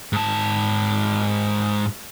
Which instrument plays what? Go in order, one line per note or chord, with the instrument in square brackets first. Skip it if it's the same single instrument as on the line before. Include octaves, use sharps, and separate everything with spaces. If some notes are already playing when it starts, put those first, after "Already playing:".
[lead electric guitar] G#2 A5